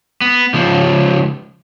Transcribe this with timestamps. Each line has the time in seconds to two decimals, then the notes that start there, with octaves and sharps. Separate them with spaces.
0.21 B3
0.54 C#2 F3